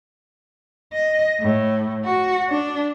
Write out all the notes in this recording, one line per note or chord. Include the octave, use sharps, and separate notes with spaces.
D#5
A2
F#4
D4